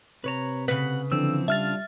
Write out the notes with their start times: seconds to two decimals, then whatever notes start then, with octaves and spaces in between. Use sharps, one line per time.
0.24 C3 B4 C#5 A#5
0.68 C#3 B4 F#5
1.12 D3 E3 F3 C4 E6
1.48 G3 D4 F4 E5 F5 F6 A6